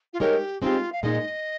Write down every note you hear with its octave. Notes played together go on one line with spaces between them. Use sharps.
F4
G#3 D#4 G4 A#4 C#5
G#3 C4 D#4 F4 G4
F5
A#2 G#3 D#4 D#5